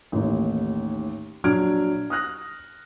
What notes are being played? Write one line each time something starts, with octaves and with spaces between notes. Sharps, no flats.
A1 D#2
A#1 F#3 D4 F6 G#6 D7
D#6 F6 F#6 A#6